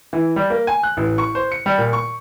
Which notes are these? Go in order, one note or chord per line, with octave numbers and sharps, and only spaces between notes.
E3
G3
A#3
G#5
F#6
A1
C#6
C5
C#7
G3
A#2
C#6